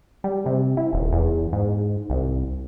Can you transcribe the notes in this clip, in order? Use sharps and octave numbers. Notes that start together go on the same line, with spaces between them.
G3
C3
E4
D#1
E2
G#2
C2